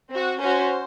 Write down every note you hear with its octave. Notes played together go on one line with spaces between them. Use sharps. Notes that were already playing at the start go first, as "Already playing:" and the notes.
C4 F#4
C#4 F#4 C5